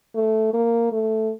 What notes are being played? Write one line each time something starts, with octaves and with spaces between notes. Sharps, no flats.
A3
A#3
A3